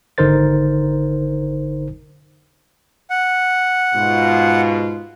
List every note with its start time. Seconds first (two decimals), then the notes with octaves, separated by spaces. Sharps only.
0.18 G#1 D3 D#4 A#4 C5 A6
3.10 F#5
3.95 G#2 B2 F4